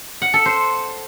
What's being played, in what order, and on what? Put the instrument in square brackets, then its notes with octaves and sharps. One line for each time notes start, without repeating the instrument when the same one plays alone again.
[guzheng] F#5
A4
C5